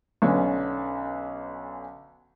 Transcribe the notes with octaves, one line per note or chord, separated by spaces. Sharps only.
B1 D3 B3 C#4